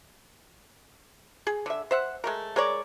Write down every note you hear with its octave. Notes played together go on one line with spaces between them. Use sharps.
G#4
D3 E5
C5 E5 F#5
G#3 A3 A#4
G#3 A#4 C#5 D5